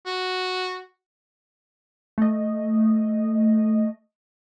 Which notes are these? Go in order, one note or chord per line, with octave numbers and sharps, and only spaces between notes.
F#4
A3 D#5